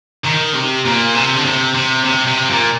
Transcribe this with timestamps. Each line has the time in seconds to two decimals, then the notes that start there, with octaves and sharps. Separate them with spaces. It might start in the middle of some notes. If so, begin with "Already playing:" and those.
0.25 D#3
0.54 C3
0.85 A#2
1.15 C3
1.36 D3
1.45 C3
1.75 C3
2.05 C3
2.27 C3
2.50 A#2